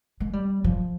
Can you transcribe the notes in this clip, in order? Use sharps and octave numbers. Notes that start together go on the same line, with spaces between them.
G#3
G3
F3